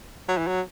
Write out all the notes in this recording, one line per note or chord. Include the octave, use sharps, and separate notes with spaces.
F#3
E3
F#3